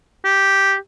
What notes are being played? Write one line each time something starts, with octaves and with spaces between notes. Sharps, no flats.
G4